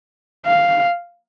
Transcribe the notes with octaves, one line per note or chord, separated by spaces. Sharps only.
F5